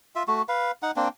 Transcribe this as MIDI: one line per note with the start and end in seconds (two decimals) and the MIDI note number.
0.15 0.23 65
0.15 0.23 76
0.28 0.42 57
0.28 0.42 66
0.49 0.71 71
0.49 0.71 77
0.83 0.91 63
0.83 0.91 78
0.96 1.08 58
0.96 1.08 60
0.96 1.08 62